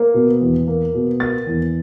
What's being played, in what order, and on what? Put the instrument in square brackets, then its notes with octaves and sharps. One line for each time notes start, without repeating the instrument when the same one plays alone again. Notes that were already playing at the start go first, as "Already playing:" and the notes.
Already playing: [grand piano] A#3
B2
E2
A#3
B2
A#3 A6
E2